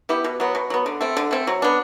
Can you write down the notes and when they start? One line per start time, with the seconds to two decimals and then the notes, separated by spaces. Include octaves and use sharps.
0.09 B3 E4 G4
0.24 B2
0.40 F#3 B3
0.55 B2
0.70 F#3 B3
0.86 D3
1.01 A3 C4
1.17 D3
1.31 A3 C4
1.47 F#3
1.62 B3 D4